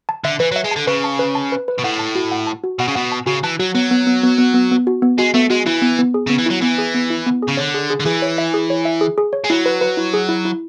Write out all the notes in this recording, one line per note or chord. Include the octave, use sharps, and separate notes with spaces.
A5
D3 E5
E3 B4
F#3
E5
G#3
D3 A5
C#3 B4
A5
B4
A5
B4
B4
B2
A2 F#5
A5
F#4
F#5
A5
F#4
B2 F#5
C#3
B2 F#5
A5
C#3 F#4
E3 A5
F#3 F#4
F#3 B3
B3
B3
B3
B3
B3
B3
F#4
B3
G#3 F#4
A3 B3
G#3 F#4
E3 E4
B3
B3
G#4
C#3 B3
E3
F#3 E4
E3 B3
G#4
B3
E4
B3
G#4
C#3
D3 C#5
G#4
G#4
D3
E3 G#4
C#5
E5
G#4
C#5
E5
G#4
G#4
C#5
G#3
F#3 E4
B4
B4
E4
G#4
E4
E4